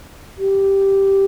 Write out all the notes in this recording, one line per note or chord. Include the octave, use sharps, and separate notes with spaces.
G4